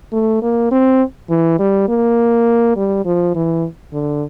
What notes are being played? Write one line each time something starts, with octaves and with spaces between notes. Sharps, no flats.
A3
A#3
C4
E3
G3
A#3
G3
F3
E3
D3